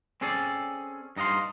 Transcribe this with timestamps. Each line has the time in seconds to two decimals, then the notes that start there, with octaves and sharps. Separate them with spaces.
0.21 C4 C#4 G#4 A4 D5
1.16 G2 D#4 D#5 F5 C6